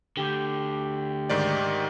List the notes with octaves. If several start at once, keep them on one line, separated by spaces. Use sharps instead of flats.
D2 D3 G4
G#2 D#3 D5